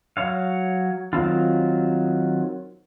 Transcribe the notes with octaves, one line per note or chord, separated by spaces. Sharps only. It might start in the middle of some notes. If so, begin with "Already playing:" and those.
F#3 C#5 F5
D#3 F#3 C4 F4